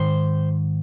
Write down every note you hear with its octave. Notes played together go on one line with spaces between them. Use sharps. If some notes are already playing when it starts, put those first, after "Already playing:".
Already playing: G#2 D#3 C5